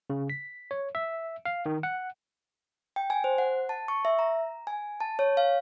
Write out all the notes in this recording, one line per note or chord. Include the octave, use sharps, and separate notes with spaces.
C#3
B6
C#5
E5
F5
D#3
F#5
G5
G#5
C5
F#5
A5
C#6
E5
A#5
G#5
A5
C#5
F5